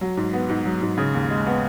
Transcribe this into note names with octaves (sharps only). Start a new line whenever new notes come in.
F#3
G#2
B3
G#2
F#3
G#2
C#3
D#2
G#3
B3